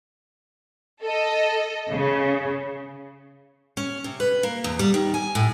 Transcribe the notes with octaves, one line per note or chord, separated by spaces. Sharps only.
A4 D#5
C#3
C#4
C3
B4
A#3
E2
G3
D#3
G#5
A2